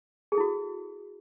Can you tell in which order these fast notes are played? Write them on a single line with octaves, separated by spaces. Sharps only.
G#4 A4 E4 F#4